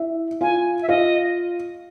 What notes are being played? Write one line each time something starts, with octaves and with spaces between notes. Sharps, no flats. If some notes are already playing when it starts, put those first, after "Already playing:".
Already playing: E4 E5
F4 F5 G#5
E5
F4 D#5 F5